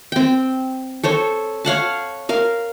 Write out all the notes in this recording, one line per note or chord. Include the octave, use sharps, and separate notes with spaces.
C4 G5
A4 C5 C#5
C#5 F5 F#5 A5
A#4 F5